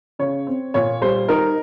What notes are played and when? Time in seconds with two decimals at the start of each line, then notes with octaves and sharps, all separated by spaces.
0.19 C#3 C#5
0.47 C4
0.74 A#2 C#5
1.02 G3 C5
1.29 D#4 A#4